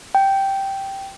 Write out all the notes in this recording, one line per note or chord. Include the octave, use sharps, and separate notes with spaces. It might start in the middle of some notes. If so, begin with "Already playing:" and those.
G5